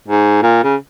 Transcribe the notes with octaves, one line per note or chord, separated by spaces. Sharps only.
G#2
A#2
C#3